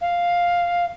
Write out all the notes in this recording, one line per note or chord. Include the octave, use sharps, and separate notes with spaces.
F5